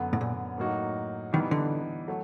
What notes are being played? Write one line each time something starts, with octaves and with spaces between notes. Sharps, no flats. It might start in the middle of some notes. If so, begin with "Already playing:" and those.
Already playing: F#2 D3 F#3 B3
A2
A#2
A2 F#3 A#3 D#4 F#4
D#3 E3 G3 B3 D#4
D3
F#3 A3